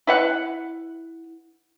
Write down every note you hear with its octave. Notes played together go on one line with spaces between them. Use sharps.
E4 B4 F#5